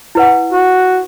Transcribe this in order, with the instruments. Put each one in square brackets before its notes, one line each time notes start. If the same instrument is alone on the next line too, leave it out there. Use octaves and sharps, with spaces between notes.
[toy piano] E4 B4 F#5
[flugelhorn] F#4